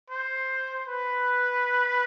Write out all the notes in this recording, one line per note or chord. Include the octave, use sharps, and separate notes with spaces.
C5
B4